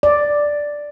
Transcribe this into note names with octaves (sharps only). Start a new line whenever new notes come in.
D5